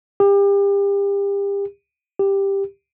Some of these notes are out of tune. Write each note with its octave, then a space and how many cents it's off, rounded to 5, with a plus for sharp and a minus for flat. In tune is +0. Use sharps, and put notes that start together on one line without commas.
G4 +35
G4 +10